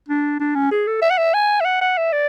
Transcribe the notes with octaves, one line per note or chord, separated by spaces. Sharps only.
D4
D4
C#4
G#4
A4
E5
F#5
E5
G#5
E5
F#5
F#5
E5
D5